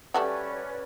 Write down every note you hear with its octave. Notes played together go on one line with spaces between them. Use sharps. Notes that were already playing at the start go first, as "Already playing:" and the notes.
G3 A3 C#4 F#4 B4 D5